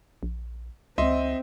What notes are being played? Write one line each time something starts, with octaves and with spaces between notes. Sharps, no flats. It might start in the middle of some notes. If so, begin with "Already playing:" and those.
A#1
C#2 C4 D#5 E5 C6